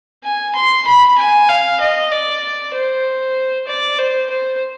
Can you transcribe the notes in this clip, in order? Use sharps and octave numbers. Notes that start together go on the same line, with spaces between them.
G#5
C6
B5
G#5
F5
D#5
D5
C5
D5
C5
C5